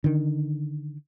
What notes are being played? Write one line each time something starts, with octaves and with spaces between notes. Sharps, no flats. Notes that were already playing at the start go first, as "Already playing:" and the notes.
D3 D#3